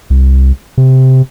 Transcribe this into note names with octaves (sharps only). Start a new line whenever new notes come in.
C2
C3